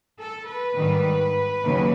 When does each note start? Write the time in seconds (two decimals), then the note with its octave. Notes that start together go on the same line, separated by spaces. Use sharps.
0.18 A4
0.47 B4
0.76 G#2 D#3 G3
1.63 D#2 C#3 F#3 A#3